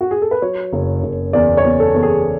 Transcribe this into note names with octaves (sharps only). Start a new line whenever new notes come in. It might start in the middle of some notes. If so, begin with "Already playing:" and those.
F#4
G#4
A4
B4
F#3 C#5
F#1
F#1
E2 D5
C#5
E2
A4
E2
G#4